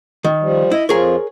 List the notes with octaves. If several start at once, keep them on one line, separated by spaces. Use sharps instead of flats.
D#3
F3 G3
E4 D#5
F2 F3 F4 G#4 A#4 C#5